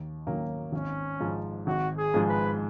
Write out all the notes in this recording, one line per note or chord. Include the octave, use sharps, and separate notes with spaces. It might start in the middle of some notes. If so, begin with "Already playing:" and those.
Already playing: D#2
D#3 F#3 A#3 C#4
G#1 C#4
G#2 F3
G#1 F#4
G#4
G#2 F3 G#3
B4